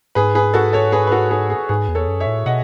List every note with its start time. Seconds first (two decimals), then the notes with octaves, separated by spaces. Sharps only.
0.15 G#2 G#4 B4
0.35 G#4 B4
0.54 F#4 A4
0.73 A4 C#5
0.92 G#4 B4
1.07 B4
1.12 F#4 A4
1.31 G#4 B4
1.50 G#4
1.69 G#2 G#4 B4
1.88 E2
1.95 A4 C#5
2.08 F#2
2.20 C#5 E5
2.26 A2
2.46 B2 D#5 F#5